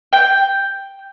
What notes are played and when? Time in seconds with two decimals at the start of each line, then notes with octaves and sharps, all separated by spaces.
0.13 G5